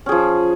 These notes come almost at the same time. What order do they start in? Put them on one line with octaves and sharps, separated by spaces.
C#4 G#4 F3